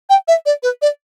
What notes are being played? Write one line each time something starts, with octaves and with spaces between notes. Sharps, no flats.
G5
E5
D5
B4
D5